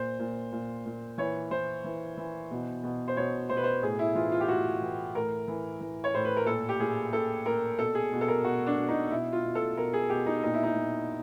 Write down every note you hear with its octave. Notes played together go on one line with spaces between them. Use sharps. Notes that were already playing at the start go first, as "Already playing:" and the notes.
Already playing: A#2 C5
A#2
A#2
A#2
E3 C#5
E3 C5
E3
E3
B2
B2
C5
B2 C#5
B2 C5
B4
C5
A2 G#4
E4
E3 F4
F4
G4
A2 F#4
E3
A2 A#4
E3
E3
C#5
A2 C5
B4
A#4
A#2 A4
G4
A#2 G#4
A#2 A4
A#2 A#4
B2 A4
G#4
B2
A4
A#4
B2 F#4
D4
B2
D#4
B2 E4
F4
B2
A4
B2 A#4
G#4
B2 G4
D#4
A#2 D#4
E4
D#4
A#2